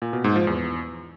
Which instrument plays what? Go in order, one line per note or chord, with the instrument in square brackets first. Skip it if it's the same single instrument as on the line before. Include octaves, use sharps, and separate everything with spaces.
[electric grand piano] A#2
B2
G#2
F3
E2